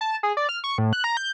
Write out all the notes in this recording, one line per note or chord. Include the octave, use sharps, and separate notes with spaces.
A5
G#4
D5
F6
C#6
A2
F#6
A#5
G6